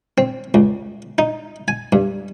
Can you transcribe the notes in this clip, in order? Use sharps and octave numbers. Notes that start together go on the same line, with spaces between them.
C4
C#2
D#4
G#5
G2